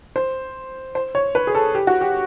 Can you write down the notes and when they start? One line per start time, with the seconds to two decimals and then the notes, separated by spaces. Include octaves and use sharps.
0.16 C5
0.95 C5
1.15 C#5
1.35 B4
1.47 G#4
1.55 A4
1.75 G4
1.87 F#4
2.01 G4